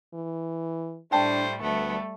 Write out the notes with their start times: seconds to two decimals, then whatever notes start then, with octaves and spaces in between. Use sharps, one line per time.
0.14 E3
1.12 A2 G3 A3 D4 C5 G5 A5
1.62 D2 G3 A3 B3 A4